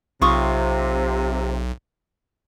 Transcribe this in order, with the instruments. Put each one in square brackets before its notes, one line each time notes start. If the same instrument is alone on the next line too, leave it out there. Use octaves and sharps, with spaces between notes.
[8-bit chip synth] B1 [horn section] C3 [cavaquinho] F4 C#6 D#6